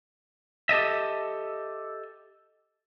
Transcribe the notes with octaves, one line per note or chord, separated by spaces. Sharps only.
G4 A4 D#5 E5